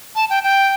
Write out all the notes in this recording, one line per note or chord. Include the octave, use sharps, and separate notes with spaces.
A5
G5
G5